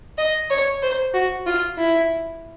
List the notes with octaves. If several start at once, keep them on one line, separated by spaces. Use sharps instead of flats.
D#5
C#5
C5
F#4
F4
E4